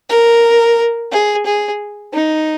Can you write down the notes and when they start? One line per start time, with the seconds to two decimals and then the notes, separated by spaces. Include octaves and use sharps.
0.10 A#4
1.12 G#4
1.46 G#4
2.14 D#4